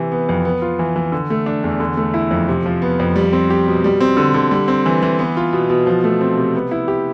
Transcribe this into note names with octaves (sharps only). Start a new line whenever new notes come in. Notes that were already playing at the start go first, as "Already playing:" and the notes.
Already playing: C3 E3
B3
F2
B3
F4
E3
E3
D3
A3
D4
E2
D3
A3
E4
F2
C3
F3
B3
F2
G3
C4
G4
B2
G3
C4
D3
D3
G3
C4
E3
E3
B3
F4
B2
B2
F3
A3
C4
C3
B3
E4
G4